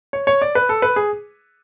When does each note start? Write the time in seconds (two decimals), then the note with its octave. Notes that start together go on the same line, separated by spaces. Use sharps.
0.13 C#5
0.27 C#5
0.42 D5
0.55 B4
0.69 A4
0.82 B4
0.96 G#4